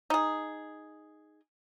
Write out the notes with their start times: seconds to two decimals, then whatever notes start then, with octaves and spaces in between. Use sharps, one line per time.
0.10 D#4 G#4